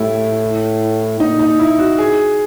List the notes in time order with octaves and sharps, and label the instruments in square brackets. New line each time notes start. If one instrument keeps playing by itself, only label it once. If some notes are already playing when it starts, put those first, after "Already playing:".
Already playing: [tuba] A2 [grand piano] E4 G4
[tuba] A#2 [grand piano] D#4
[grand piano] D#4
E4
F#4
G#4